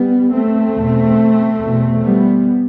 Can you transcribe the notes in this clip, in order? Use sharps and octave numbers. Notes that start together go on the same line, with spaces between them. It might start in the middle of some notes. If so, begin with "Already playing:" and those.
Already playing: G3 B3
A3 C4
E2
B2
E2 B2
G3 B3